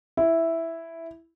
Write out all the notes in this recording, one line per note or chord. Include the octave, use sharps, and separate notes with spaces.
E4